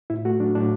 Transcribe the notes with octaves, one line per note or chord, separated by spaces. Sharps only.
A2 E4
A3 F#4
F#3 D4
A2 D4